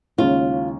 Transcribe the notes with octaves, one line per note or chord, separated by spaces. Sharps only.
D#2 C#3 G#3 C#4 F4